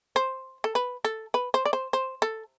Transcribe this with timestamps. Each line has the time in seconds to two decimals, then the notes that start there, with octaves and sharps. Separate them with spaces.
0.16 C5
0.64 A4
0.75 B4
1.05 A4
1.34 B4
1.54 C5
1.66 D5
1.73 C5
1.93 C5
2.22 A4